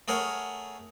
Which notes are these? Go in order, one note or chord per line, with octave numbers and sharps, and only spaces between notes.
A3 G#4 A#4 C#5 F#5